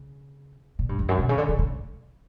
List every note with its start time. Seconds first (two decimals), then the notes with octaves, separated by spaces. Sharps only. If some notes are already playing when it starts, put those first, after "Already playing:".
Already playing: C#3
0.79 A#2
0.89 G2
0.99 E2
1.09 F#2
1.19 B2
1.29 C#3
1.38 D3
1.49 C#3
1.59 C#3